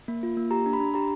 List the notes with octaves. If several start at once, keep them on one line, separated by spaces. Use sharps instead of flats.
A#3
F4
A#3
G4 A#5
D4
B5
D4
G4 A#5